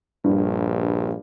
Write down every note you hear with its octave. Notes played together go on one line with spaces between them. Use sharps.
A#1 G2